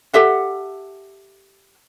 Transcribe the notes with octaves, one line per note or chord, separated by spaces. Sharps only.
G4 A4 E5 F#5